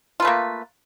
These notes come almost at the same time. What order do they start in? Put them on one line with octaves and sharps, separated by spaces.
F4 B4 A3 A#3